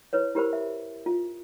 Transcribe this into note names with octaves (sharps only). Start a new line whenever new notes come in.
E4 B4 C#5
E4 G4 A#4 C5 B5
E5
F4